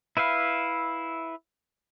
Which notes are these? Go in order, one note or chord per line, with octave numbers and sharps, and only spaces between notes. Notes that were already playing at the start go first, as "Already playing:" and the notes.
E4 B4 E5 F5